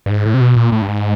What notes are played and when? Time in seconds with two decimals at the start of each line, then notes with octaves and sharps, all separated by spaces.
0.06 G2
0.10 G#2
0.25 A2
0.34 C3
0.41 B2
0.56 A#2
0.72 A2
0.82 G2
0.88 G#2